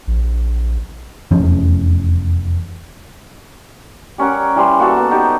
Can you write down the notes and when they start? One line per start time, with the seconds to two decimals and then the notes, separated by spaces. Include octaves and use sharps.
0.07 A#1
1.31 F1 E2 F3 C#4
4.18 G3 C#4 A#4 F#5
4.56 E3 G3 B5 C6
4.80 A#3 F#4 A4 A5
4.97 B3
5.11 D#4 G4 A5